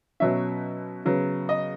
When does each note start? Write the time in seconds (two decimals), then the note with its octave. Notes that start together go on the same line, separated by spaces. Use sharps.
0.20 B2 F#3 C#4 E5
1.05 C#3 F#3 B3
1.49 D#5